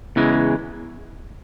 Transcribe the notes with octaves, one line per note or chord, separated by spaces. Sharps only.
E2 C#3 E3 G#3